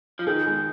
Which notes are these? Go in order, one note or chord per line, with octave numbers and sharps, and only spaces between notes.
F3
D#3 G#4
G#3